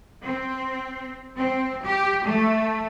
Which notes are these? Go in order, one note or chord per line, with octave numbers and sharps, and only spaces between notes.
C4
C4
G4
A3